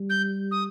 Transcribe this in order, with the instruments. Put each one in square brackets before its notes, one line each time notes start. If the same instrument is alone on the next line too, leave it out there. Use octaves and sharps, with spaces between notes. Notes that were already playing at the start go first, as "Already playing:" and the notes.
Already playing: [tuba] G3
[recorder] G6
D#6